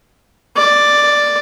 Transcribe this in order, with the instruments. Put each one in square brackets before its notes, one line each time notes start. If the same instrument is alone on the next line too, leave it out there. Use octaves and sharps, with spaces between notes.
[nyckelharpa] D5